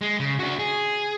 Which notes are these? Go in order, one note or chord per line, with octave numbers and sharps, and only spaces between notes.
G#3
C#3
D4 F#4
G#4